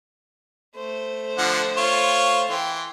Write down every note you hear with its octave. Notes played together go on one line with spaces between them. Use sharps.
A3 C5
D3 F3 F#5
F4 C#5
E3 G5 C6